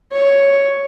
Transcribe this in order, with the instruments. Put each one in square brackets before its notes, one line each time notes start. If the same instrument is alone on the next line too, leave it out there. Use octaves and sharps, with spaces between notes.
[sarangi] C#5